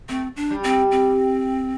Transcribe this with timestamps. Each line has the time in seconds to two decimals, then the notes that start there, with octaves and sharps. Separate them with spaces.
0.09 A3 C4
0.36 D4
0.50 G3
0.64 C4
0.91 C4